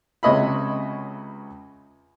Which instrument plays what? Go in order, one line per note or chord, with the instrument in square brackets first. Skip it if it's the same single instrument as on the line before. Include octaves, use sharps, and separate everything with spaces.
[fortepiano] C#2 C3 C#5 D#5 E5 B5